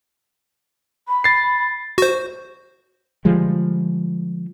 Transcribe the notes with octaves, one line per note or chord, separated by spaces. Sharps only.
B5
A6 C7
F#4 C5
D3 F3 G3 G#3